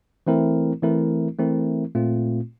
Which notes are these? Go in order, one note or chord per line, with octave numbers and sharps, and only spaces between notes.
E3 A3 C4 E4 A#4
E3 A3 C4 E4 A#4
E3 A3 C4 E4 A#4
A#2 A3 C4 F4